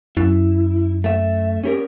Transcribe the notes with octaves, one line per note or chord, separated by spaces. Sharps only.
F#2 E4
A3 E5
C#4 G4 A#4